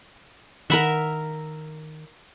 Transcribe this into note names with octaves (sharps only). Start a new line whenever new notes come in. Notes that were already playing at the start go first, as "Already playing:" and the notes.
D#3 A#4 E5 F#5 B5